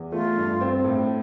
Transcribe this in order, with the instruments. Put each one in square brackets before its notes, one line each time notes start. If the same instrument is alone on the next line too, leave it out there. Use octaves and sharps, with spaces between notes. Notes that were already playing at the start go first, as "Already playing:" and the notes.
Already playing: [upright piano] E2
[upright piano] A3 [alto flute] F4
[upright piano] G2
C4
A2